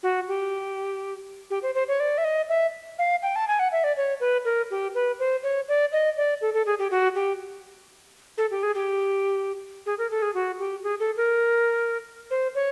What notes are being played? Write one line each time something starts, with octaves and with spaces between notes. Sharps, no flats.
F#4
G4
G4
C5
C5
C#5
D5
E5
D#5
E5
F5
G5
A5
G#5
F#5
E5
D5
C#5
B4
A#4
G4
B4
C5
C#5
D5
D#5
D5
A4
A4
G#4
G4
F#4
G4
A4
G4
G#4
G4
G#4
A#4
A4
G#4
F#4
G4
G#4
A4
A#4
C5
C#5